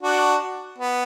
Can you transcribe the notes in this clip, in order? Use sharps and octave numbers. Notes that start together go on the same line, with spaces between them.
D4 F#4
B3